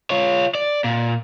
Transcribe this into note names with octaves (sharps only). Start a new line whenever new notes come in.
F4 C#5
D5
A#2